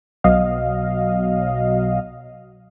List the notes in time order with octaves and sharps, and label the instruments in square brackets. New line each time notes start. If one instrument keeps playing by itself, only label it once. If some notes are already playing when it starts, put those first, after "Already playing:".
[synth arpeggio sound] B1 B2 F#3 D#5 F5